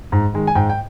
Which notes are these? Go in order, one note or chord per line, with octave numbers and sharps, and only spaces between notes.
G#2
D#3 G#3
G#5
G#2 G5
G5